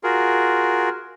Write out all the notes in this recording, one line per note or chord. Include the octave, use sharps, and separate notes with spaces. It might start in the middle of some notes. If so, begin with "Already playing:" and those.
F4 F#4 G#4 A#4